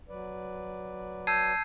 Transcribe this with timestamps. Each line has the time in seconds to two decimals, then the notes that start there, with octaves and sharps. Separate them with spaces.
0.09 F#3 B4 D5
1.27 A5 E6 G6 G#6 C7 D#7